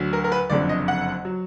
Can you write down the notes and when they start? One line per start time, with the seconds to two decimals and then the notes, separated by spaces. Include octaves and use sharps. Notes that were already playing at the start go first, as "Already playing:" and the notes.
Already playing: D2 D3 F#3
0.13 A#4
0.24 A#4
0.32 B4
0.50 F#1 F2 D3 D5
0.69 D#5
0.88 F#5
1.25 F#3